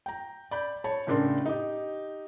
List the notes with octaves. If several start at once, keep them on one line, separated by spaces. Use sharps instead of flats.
G5 A#5
D5 B5 G6
C#5 A5 B5
A2 C#3 A3 D4 A#4 C6
D#4 G4